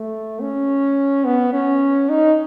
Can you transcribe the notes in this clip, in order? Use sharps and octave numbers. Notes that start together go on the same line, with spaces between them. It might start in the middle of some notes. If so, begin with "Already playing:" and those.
Already playing: A3
C#4
B3
C#4
D#4